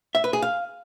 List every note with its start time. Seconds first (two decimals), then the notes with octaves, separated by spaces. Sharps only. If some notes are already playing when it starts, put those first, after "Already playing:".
0.15 E5
0.24 B4
0.33 G#4
0.42 F5